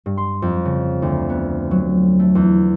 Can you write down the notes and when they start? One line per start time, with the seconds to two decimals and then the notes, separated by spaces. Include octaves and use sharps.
0.06 G2
0.17 C6
0.42 F2
0.65 C#3
1.02 D2
1.29 B3
1.71 F#3
2.19 A3
2.35 E2